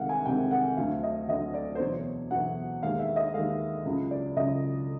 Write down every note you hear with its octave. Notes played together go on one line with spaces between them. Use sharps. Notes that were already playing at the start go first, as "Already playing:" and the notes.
Already playing: C2 C3 D#3 G#3 F5 F#5
G#5
C2 C3 D#3 G#3 G5
F#5
D2 D3 F#3 F5
D#5
D2 D3 F#3 D#5
D5
C5
E2 B2 F#3 C#5
E2 B2 F#3 F#5
D#2 D#3 G#3 F5
E5
D#5
D#2 D#3 G#3 F5
C#2 C#3 F#3
D5
C#2 C#3 F#3 D#5